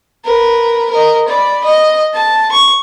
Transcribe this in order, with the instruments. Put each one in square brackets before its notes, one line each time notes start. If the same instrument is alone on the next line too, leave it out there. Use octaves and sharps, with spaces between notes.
[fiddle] A#4 B4
A#4 D#5
D5 B5
D#5
A5
C#6